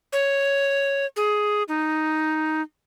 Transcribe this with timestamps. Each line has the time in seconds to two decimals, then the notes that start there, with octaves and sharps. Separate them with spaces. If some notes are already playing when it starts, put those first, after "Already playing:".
0.13 C#5
1.16 G#4
1.68 D#4